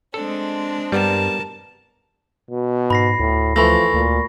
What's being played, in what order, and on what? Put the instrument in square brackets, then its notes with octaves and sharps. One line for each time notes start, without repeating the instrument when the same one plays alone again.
[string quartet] G#3 C4 D4 [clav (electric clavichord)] A4
[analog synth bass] G2 [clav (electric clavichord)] G3 B3 [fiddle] A#4 A5
[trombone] B2
[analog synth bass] G#2 [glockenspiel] B5 A#6 C7
[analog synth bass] D2 [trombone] A2
[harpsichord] E3 A3 [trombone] F3 [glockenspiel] B5 C#6 A#6
[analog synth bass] D2 [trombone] A#2